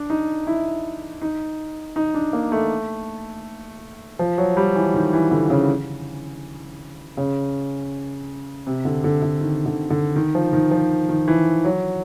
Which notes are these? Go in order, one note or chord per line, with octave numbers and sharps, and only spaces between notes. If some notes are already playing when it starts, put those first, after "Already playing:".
Already playing: D4
D#4
E4
D#4
D#4
D4
A#3
A3
F3
F#3
G3
E3
D#3
E3
D3
C#3
C#3
C3
D3
D3
D3
D#3
D3
D3
D#3
F3
D#3
F3
D#3
E3
F#3